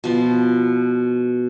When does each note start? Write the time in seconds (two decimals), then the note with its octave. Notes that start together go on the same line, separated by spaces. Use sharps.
0.04 B2 F3